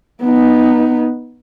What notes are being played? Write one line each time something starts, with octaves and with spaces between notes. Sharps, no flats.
B3 D#4